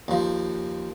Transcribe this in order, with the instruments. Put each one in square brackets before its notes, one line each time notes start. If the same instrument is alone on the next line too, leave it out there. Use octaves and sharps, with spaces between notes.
[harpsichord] D#2 F3